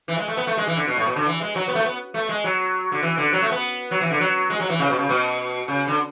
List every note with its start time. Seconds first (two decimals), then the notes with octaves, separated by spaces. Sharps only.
0.08 E3
0.18 G#3
0.28 A3
0.37 B3
0.47 A3
0.57 G#3
0.67 E3
0.76 D3
0.87 B2
0.97 A2
1.06 B2
1.16 D3
1.26 E3
1.41 G#3
1.55 F#3
1.68 B3
1.75 A3
1.85 B3
2.14 A3
2.29 G#3
2.44 F#3
2.92 D3
3.02 E3
3.17 D3
3.32 F#3
3.42 A3
3.51 B3
3.91 F#3
4.01 E3
4.11 D3
4.20 F#3
4.50 G#3
4.60 F#3
4.70 E3
4.79 C#3
4.90 B2
4.99 C#3
5.09 B2
5.68 C#3
5.88 D3